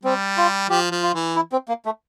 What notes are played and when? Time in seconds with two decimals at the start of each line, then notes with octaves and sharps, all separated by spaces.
0.03 G3 C4
0.37 F4
0.69 F3 G4
0.91 F3
1.03 F4
1.14 E3
1.36 E4
1.52 C4
1.68 A#3
1.85 A3